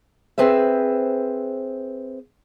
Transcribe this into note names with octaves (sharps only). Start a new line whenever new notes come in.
C4 G#4 B4 C5 E5